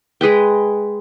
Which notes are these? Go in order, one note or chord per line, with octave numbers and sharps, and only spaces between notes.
G#3 G#4 B4 G5